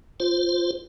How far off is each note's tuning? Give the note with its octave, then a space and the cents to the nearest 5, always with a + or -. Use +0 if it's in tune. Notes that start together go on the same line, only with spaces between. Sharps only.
F4 +0 C5 +0